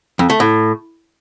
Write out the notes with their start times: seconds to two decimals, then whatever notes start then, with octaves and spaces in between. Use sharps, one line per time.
0.19 F2
0.30 A3
0.40 A2